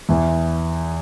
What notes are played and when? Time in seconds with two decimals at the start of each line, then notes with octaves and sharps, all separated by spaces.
0.09 E2 E3